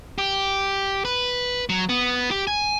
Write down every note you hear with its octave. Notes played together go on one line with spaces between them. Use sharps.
G4
B4
F#3
B3
G4
G#5